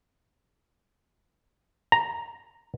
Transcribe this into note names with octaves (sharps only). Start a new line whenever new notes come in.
A#5